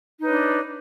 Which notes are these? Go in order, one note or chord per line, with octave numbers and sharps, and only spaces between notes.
D4 D#4 B4 C#5